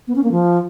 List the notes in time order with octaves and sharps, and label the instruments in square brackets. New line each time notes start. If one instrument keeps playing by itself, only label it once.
[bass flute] B3
C#4
A#3
F3